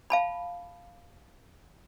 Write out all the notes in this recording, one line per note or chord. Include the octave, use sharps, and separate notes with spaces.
F5 A5 B5